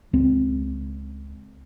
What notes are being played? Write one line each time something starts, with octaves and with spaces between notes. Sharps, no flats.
C#2 C4